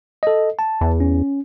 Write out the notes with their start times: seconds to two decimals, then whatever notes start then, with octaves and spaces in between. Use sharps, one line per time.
0.23 A4 D#5
0.59 A5
0.81 E2
1.00 C#4